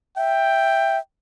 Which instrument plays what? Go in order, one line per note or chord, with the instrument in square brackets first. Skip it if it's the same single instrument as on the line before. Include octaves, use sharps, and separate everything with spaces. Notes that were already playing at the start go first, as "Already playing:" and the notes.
[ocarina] E5 [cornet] G5